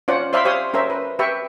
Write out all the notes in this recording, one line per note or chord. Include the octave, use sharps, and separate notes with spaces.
C#4 F4 C5 D5 F#5
C5 D5 E5 F5 B5 C6
G4 C5 C#5 F5 C6 D#6
C#4 A#4 C5 E5
B4
G4 B4 E5 G5 C#6